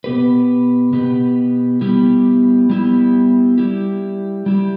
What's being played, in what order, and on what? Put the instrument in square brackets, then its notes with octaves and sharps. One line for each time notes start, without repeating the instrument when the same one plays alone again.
[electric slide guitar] B2 B3 G4 B4
B2 B3 G4 B4
G3 B3 E4 G4
G3 B3 E4 G4
G3 E4 G4
G3 E4 G4